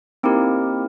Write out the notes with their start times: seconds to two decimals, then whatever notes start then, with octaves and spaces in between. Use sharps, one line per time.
0.23 A#3 C4 D#4 E4 G4 A#4